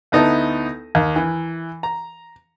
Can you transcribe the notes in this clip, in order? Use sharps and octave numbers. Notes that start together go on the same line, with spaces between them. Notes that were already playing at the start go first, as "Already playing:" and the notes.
D2 B3 D#4 E4 A5
D#2
E3
A#5